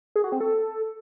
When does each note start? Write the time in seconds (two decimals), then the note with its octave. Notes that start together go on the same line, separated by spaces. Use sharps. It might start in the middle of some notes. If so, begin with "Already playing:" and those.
0.16 G#4
0.24 F#4
0.32 C4
0.40 A4